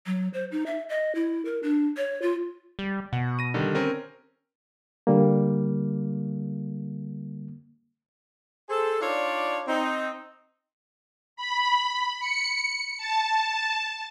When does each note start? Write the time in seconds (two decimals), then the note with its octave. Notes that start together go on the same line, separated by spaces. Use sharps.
0.06 F#3
0.34 C5
0.52 D#4
0.66 E5
0.89 D#5
1.15 E4
1.45 A#4
1.63 D4
1.97 C#5
2.22 F4
2.79 G3
3.13 B2 F#5
3.39 A#6 D#7
3.54 D3 D#3 G3
3.75 C4 C#4 A#4
5.07 D3 G3 A#3
8.69 G#4 A4 C5
9.00 D4 D#4 F4 C#5 D5
9.68 C4 D#4
11.36 B5
12.20 C#7
12.98 A5